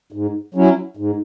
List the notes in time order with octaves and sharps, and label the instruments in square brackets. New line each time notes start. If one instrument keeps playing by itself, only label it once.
[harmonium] G#2
F#3 C#4 E4
G#2